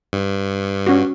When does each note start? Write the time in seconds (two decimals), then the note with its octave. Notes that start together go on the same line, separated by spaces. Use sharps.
0.13 G2
0.87 C#4 F#4